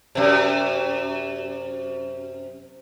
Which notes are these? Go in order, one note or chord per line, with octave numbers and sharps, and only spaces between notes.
F#2 C3